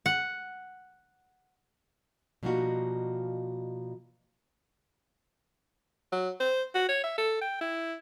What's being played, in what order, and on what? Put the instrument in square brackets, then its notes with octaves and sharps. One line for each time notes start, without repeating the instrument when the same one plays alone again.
[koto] F#5
[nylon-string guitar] B2 F3 G3 A#3 D#4 F#4
[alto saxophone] F#3
C5
F#4
C#5
E5
A4
G5
E4